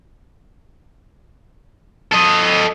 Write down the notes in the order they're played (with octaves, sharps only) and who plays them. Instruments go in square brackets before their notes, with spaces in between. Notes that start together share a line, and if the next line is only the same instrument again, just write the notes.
[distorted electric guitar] A4 D#5